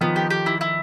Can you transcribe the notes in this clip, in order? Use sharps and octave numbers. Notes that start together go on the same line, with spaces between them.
D#3 F3 B3
G4
G4
E4
E4